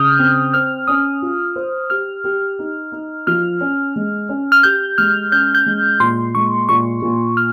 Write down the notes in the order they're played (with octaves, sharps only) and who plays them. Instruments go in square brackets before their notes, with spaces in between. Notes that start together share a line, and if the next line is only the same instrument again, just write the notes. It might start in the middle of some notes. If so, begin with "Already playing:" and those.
Already playing: [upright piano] C#3 [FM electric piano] D#6 F6 G6
[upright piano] C4
[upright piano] C5 [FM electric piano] F6
[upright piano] C#4 [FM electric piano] D#6
[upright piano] F4
C5
[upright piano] G4 [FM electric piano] F6
[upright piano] G4
D#4
D#4
[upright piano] F3 [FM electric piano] F6
[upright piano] C#4
G#3
C#4
[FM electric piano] F6
[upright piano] G4 [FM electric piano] G6
[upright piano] G#3 [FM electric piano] F6
[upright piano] C#4 [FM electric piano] G6
[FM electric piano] G6
[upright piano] G#3
[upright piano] A#2 [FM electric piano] C6
[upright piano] G#3 [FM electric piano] C#6
[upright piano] A#2 [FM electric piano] C#6
[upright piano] A#2
[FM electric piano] F6